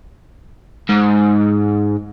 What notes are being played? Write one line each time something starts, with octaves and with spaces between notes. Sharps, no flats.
G#2